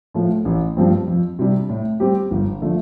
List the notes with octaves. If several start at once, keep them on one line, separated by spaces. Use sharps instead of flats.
A2 F3 A3
A1
G2 F3 C4
F2
C3 G3 D4
A2
G3 C4 G4
G1
D3 F3 A3